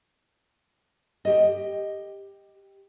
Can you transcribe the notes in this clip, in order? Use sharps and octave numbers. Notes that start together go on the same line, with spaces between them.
G4 D#5